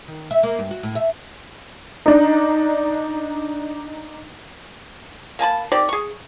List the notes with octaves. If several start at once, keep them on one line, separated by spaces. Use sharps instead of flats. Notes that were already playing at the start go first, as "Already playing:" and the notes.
D#3
E5
A#3
G2
F#4
A2
E5
D4 D#4
A#3 G#5 A5 B5
D#3 C4 G4 D5
G#4 C#6